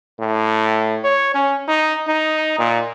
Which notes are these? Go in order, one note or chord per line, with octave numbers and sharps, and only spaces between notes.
A2
C#5
C#4
D#4
D#4
A#2